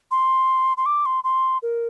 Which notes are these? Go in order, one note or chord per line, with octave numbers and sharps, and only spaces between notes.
C6
C6
D6
C6
C6
A#4